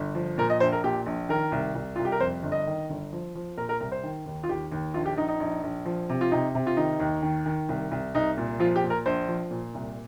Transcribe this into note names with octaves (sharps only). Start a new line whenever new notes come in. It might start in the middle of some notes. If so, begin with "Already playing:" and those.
Already playing: G1
F3
A#2 A#4
D#5
A#1 C5
A#4
A#2 G4
A#1
D#3 A#4
C2
C2
C2 F4
G4
A#4
F2 C5
G1
D#5
D#3
G1
F3
F3
A#2 A#4
A#4
C2 A#4
C5
D#3
D#2
F4
D#2 G4
D#2
A#1 F4
G4
A#1 D#4
D#4
A#1
A#1
F3
C3
F4
C3 D#4
C3
F4
D#3 D#4
D#2
D#3
D#3
C2
C2
C2 D#4
A#2
F3 F4
G4
A#2
A#4
A#1 C5
F3
A#2
C2